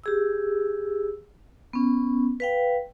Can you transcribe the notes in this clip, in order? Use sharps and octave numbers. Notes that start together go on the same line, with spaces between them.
G4 G#4 E6
B3 C#4
B4 F5 G5